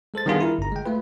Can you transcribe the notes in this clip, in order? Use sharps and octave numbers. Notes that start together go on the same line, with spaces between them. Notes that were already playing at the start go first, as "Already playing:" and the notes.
G#3 A4 C5 A6
D#3 G3 B3 D4 F4 G#4
E4 A#4
G1 A#5
G#3 G5
A3 F4 B4